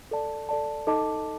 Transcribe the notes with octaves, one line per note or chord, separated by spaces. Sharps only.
A4 D5 A5
A4 D5 A5
D#4 A4 D#5 A5 D6